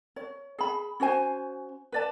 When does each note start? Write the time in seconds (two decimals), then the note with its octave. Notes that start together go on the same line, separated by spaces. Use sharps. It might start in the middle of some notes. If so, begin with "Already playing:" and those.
0.16 C#5
0.59 G#4 B5
1.00 C#4 F#4 C5 G#5
1.92 B4 D5 A5